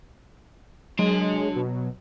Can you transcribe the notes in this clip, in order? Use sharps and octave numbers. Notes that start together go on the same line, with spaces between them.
F#3 G#3 D4 C6
B2